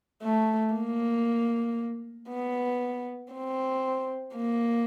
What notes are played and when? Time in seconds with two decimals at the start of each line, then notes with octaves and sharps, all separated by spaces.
0.23 A3
0.74 A#3
2.30 B3
3.33 C4
4.36 A#3